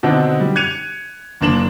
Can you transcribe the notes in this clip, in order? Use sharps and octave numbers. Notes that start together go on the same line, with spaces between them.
B2 D3 C4 D4 D#4
G3
F#6 G#6 C#7 D#7 F7
F#1 A#3 D4 E7 F#7